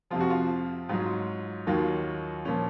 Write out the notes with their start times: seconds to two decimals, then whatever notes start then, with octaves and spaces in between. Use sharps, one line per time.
0.11 F2 C3 F3 F4
0.20 F#4
0.30 F4
0.89 G#2 F#3 F4
1.67 D#2 D#3 F#3 F4
2.45 A#2 F3 C#4